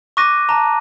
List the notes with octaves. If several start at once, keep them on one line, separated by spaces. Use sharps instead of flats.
C#6 D6 F#6 A#6 D#7
A5 A#5